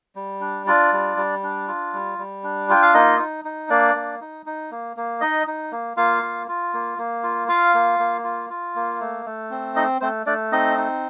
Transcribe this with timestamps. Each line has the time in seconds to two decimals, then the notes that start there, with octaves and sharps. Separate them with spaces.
0.15 G3
0.41 D4
0.67 D4 F4 D5
0.92 G3
1.17 G3
1.43 D4
1.68 F4
1.93 G3
2.18 G3
2.44 D4
2.69 F4 G5
2.82 F5
2.94 A#3 D#4 D#5
3.19 D#4
3.45 D#4
3.69 A#3 D4 D5
3.95 A#3
4.21 D#4
4.46 D#4
4.71 A#3
4.97 A#3
5.21 D#4 D#5
5.47 D#4
5.72 A#3
5.97 A#3 F4 F5
6.23 F4
6.48 F4
6.74 A#3
6.98 A#3
7.23 F4
7.48 F4 F5
7.74 A#3
7.99 A#3
8.24 F4
8.50 F4
8.76 A#3
9.00 A3
9.26 A3
9.51 C4
9.76 D#4 D#5
10.01 A3 C4 C5
10.26 A3 D4 D5
10.52 C4 D#4 D#5
10.77 D#4